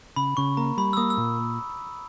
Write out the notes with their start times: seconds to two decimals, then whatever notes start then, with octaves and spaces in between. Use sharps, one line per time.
0.16 C#3 B5
0.37 C#3 C#6
0.57 A#3 A#5
0.77 G3 B5
0.93 E6
0.97 A#3 D#6
1.10 E6
1.17 A#2